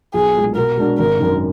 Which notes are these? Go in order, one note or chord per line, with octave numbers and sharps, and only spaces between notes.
B1 G#4
A#2 G#3
B2 A#4
G#3 D4 F#4
G#1 A#4
F#2 D#3